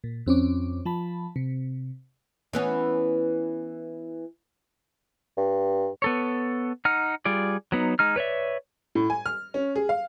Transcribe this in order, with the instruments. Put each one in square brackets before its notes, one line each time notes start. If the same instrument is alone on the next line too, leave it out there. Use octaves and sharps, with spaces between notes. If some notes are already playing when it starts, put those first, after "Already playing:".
[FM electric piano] A#2
F2 C4 C#4 D6
F3 A5 B5
C3
[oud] E3 B3 C#4
[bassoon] G2
[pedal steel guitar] B3 A4 C#5
D#4 F#5 F6
G3 F4 G#4 D5
F#3 B3 D#4
G#3 D#4 F6
B4 C#5 D5 E5
[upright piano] A2
G#5
F6
C#4
G#4
F5